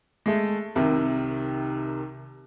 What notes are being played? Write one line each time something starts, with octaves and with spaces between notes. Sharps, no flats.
G#3 A3
C2 C3 D#3